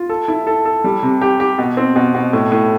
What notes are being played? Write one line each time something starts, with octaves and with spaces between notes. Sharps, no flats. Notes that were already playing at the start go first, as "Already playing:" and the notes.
Already playing: F4
A4
E4
A4
A4
G3
C3
G4
G4
B2
C4
B2
B2
A2
A2